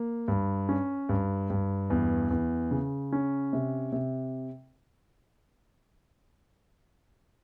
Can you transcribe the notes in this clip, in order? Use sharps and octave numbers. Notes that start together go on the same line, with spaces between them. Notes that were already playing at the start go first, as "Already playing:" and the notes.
Already playing: A#3
G2
C#4
G2
G2
E2
E2
C#3
C#4
C3
C3